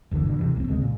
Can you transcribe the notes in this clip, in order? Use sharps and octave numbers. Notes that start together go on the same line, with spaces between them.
F#1 D#2 D3 E3
G2 B2 D3
C3 E3
E1 C2 B3 C4
D#2 C#3 G#3 C4
A#2